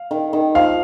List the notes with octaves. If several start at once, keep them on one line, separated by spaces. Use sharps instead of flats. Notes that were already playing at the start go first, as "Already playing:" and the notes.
Already playing: F5
D#3
D#3
F3 F5